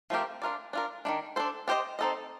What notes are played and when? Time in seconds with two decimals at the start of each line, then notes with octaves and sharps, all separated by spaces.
0.10 F3 A3 C4 G4 A#4
0.42 D4 F4 A#4 D5
0.73 D4 F4 A#4
1.05 D#3 A3 D4
1.36 D4 A4 C5
1.68 D4 G4 C5 D#5
1.99 C4 D#4 A4 D#5